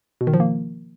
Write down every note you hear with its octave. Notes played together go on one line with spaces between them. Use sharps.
B2
D#3
F3
A#3